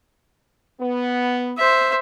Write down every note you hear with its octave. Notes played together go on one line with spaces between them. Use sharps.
B3
C5 E5